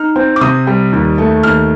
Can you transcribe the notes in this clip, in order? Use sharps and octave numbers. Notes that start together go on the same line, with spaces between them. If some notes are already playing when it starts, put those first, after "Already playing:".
Already playing: D#4 F6
C4
D6
C3 D#6
G3
D#2
A3
D#2 F6